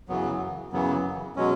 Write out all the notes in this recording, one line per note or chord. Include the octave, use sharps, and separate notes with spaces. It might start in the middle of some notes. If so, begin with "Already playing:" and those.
F#2 C#3 E3 F#3 B3
F#2 C#3 E3 F#3 B3
B2 F#3 G#3 C#4